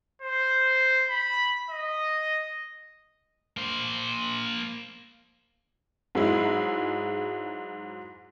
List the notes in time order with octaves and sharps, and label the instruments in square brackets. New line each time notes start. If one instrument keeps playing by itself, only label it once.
[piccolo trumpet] C5
B5
D#5
[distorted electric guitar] A#3 C5
[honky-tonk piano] G#2 F#3 G#3 E4